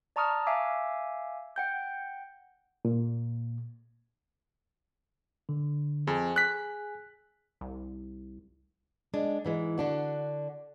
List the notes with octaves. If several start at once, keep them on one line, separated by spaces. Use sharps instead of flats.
D5 A5 A#5 C#6 D#6 F6
E5 F5 G#5 D6 E6
F#5 G5 G6
A#2
D3
F2 G#4 G#5
F#6 B6
C2
G#3 D4
G#2 E3 G#3
D3 D4 F#4